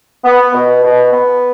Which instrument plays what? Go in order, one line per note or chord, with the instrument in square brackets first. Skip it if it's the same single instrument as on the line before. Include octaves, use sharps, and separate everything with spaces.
[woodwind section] B3
B2
B2
B3